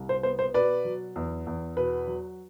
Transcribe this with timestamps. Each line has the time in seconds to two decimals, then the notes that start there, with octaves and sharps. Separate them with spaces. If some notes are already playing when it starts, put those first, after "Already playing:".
Already playing: C2
0.09 C5
0.23 B3 C5
0.39 C5
0.54 B2 B4 D5
0.85 F#3
1.16 E2
1.47 E2
1.77 B2 B4
2.07 F#3